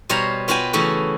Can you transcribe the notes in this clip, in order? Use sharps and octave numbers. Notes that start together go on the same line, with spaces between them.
B2 G3 C5 C#5 F5 A#5
B3 F4 F#4 B4 G5 G#5
C#3 E3 A3 C#4 F#4